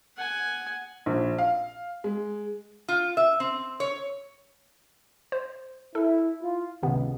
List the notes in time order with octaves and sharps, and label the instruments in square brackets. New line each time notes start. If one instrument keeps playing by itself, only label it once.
[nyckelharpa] F#5 G#5
[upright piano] A#1
F5
G#3
[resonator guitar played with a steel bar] F4
E5
C4
C#5
[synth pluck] C5
[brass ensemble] E4 [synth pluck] A4
[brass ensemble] F4
[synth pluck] G#1 C3 B3 [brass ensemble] C#2